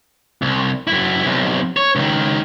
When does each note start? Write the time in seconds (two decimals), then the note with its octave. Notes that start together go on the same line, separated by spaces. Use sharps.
0.42 C2
0.87 F#2 E4
1.25 B1 C3
1.77 C#5
1.96 C#2 D#3